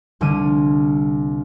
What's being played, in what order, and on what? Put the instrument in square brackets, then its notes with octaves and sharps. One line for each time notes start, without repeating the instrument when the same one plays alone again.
[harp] C2 D3 G3 F6 D#7